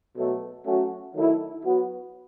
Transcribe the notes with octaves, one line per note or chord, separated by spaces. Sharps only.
B2 F#3 A3
F#3 A3 C#4 F#4
D#3 F#3 A3 E4 A4
F#3 B3 F#4